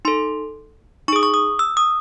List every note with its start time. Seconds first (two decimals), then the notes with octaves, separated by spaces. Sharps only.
0.05 D#4 A4 C6
1.08 D#4 C#6
1.13 G#4 D#6
1.23 C#6
1.34 D#6
1.59 E6
1.77 D#6